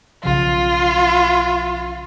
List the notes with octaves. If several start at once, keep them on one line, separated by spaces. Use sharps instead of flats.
B1 C#3 F3 F4